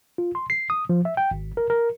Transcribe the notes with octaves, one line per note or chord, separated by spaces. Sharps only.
F4
C6
C7
D#6
F3
E5
G5
G#1
A#4
A#4